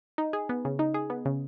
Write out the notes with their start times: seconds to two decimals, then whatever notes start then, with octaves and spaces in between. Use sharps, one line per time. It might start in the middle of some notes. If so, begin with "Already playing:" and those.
0.18 D#4
0.33 G#4
0.49 B3
0.65 C#3
0.79 D#4
0.94 G#4
1.10 B3
1.26 C#3